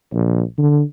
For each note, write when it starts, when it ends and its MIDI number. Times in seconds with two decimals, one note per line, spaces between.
0.13 0.42 34
0.58 0.82 50